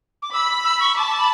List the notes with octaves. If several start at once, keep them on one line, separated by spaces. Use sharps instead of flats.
D6
B5 E6
E6
C#6
A5 D6
B5